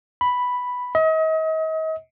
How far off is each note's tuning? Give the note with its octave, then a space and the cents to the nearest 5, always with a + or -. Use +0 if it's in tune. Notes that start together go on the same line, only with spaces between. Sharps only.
B5 +0
D#5 +40